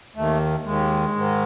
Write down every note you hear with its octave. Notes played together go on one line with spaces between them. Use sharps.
D#2 D#3 A3
D#2 D#3 G#3
G#2 D#3